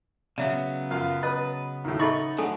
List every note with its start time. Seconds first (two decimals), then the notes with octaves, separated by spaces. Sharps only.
0.38 C#3 F#3 B3 D5 E5
0.91 F#2 F4 F5
1.23 B4 D#5 D#6
1.84 D#2 A2
1.99 D#4 A4 D#5 E5 B5 C#6
2.38 D2 D3 F#3 A4 G#5 D#6